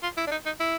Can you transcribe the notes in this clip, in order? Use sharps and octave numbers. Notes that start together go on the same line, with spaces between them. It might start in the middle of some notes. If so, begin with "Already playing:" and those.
F4
E4
D4
D#4
D#4
E4